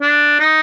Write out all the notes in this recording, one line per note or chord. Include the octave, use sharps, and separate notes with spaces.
D4
D#4